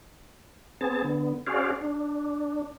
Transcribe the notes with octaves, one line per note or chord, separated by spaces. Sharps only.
B3 C4 G#4 A5
D3 B3
C#4 F#4 G#4 C5 D5 F5
D4